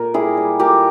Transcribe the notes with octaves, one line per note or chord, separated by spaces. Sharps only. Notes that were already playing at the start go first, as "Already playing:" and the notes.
Already playing: A#2 A#4
G3 E4 G#4
G3
A#2 G4 A#4